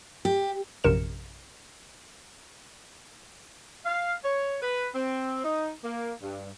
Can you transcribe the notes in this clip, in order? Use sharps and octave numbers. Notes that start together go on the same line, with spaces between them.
G4
A#1 F#2 C3 A#4 C#7 E7
F5
C#5
B4
C4
D#4
A#3
G2